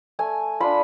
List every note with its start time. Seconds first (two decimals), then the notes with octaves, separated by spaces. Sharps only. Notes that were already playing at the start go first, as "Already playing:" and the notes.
0.19 A3 G#5
0.60 D4 F4 B5